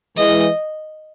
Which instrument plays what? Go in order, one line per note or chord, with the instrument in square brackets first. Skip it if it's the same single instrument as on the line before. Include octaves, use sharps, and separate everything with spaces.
[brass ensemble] E3 G#3 [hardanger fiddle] D#5